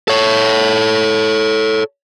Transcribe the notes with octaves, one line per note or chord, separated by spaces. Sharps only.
A4 C#5